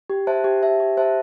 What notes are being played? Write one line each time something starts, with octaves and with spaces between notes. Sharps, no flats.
G4
C5 E5 A5
G4
C5 E5 A5
G4
C5 E5 A5